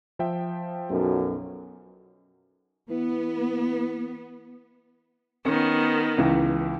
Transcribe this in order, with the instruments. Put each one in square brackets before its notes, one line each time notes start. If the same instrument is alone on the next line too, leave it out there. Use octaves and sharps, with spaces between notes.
[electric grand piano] F3 E5 G5
[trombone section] B1 F#2
[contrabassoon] E3 [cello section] B3
[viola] D#3 B3 [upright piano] C#4
[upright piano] C#2 E3